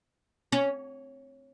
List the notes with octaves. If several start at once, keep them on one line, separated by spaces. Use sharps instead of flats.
C#4